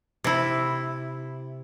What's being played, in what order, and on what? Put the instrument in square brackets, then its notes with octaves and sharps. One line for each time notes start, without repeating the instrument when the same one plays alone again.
[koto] C3 E4